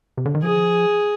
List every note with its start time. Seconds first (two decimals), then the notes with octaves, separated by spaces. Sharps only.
0.18 C3
0.25 D3
0.35 D#3
0.43 F3 G#4